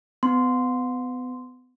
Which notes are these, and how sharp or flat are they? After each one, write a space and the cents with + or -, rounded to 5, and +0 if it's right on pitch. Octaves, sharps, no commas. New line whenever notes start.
B3 +35 C6 -10